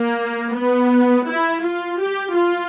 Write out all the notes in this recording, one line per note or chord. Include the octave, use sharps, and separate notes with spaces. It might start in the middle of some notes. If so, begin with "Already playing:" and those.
Already playing: A#3
B3
E4
F4
G4
F4